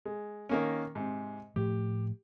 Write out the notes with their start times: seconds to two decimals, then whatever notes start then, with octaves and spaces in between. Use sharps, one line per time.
0.05 G#3
0.49 D#3 A#3 C#4
0.95 G#2 C3
1.56 A2 F3 A3 G4